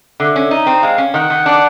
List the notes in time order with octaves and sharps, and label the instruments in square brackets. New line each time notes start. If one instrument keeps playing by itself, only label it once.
[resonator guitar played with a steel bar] D3 [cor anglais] E5
[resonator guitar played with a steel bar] C#4
D#4
C4
[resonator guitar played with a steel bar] G#3 [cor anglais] F5
[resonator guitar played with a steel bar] C#4
[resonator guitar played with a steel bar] D#3 [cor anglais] F#5
[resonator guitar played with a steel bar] D#3
D4